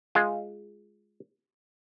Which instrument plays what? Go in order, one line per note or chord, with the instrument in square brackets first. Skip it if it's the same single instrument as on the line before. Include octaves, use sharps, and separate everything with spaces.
[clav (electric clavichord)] G#3 F4